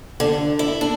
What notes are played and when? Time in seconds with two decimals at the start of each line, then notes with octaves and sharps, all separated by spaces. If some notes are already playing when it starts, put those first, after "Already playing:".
0.20 D3
0.59 E4
0.81 D4